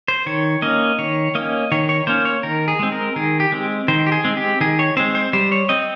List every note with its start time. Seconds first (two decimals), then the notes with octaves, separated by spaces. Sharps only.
0.08 C5
0.26 D#3 C#5
0.62 A#3 C#4 D#5
0.99 D#3 C#5
1.35 A#3 C#4 D#5
1.72 D#3 C#5
1.89 C#5
2.07 A#3 C#4 C5
2.25 C#5
2.43 D#3 A#4
2.68 G#4
2.79 G#3 C4
2.92 A#4
3.16 D#3 G#4
3.40 G4
3.52 G#3 C4
3.88 D#3 C5
4.07 G4
4.12 G#4
4.25 G#3 C4
4.37 G4
4.61 D#3 G#4
4.79 C#5
4.97 G#3 C4 C5
5.15 C5
5.33 G3 C5
5.52 C#5
5.69 C4 D#5